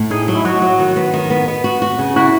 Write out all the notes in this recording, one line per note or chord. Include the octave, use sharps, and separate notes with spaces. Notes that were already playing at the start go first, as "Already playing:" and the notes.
Already playing: A2
D#4 G#4
F#3
E4
F#3 F#4
F#3
D#3
B3
D#3
B3
B3
F#4
F#4
C#3
E4 F#4